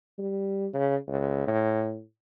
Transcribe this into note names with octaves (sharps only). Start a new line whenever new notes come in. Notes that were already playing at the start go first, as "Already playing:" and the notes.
G3
C#3
C#2
A2